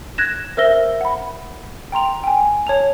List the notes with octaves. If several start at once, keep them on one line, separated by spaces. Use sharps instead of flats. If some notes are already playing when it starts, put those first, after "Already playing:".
F#6 G#6 A#6 E7
A#4 C5 E5 E6 A#6 G7
F#5 B5
G5 A#5 C6 F7
G5 G#5
C#5 A5 F7